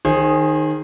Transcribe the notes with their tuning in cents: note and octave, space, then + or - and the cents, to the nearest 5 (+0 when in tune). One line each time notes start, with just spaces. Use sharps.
D#3 -10 G#4 +0 C5 +35